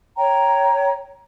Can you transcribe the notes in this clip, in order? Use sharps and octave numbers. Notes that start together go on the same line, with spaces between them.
C#5 G5 A#5